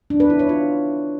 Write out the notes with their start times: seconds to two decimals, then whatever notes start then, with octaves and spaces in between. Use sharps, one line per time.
0.10 D4
0.20 B4
0.30 E4
0.39 C#5
0.49 F4